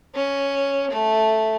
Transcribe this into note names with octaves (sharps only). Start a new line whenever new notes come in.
C#4
A3